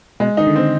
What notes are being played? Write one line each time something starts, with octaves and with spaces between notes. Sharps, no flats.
B2 G#3
D#3 D#4
D3
C4